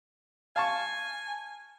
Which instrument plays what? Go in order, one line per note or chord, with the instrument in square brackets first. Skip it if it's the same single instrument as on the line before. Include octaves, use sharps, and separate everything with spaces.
[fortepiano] F5 A5 C#6 [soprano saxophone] G#5